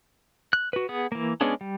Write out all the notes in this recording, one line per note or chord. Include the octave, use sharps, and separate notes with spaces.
F#6
F#4 B4
B3 G#4
E3 A#3
G#3 B3 C#4 D4 G#4
G3